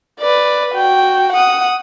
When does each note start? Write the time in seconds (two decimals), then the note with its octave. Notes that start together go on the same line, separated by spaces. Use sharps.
0.20 B4 D5
0.74 F#4 G5
1.33 F#5 D#6